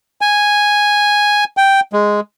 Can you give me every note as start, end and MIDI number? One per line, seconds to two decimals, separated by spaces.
0.21 1.44 80
1.57 1.80 79
1.93 2.20 56